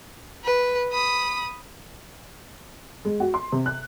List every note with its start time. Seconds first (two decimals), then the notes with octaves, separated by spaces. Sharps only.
0.44 B4
0.92 B5 D#6
3.05 G#3
3.20 F#4
3.34 C6
3.52 C3
3.66 F#6